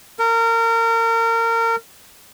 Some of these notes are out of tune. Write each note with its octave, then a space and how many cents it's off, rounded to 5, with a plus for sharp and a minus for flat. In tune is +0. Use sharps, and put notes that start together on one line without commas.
A#4 -30